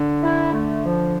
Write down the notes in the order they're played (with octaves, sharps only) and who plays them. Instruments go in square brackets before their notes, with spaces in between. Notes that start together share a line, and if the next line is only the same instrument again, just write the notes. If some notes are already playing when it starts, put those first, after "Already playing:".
Already playing: [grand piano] D3
[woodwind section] E4
A3
F3